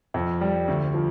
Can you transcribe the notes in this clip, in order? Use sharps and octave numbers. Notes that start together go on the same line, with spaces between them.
F2
G3
D2
F3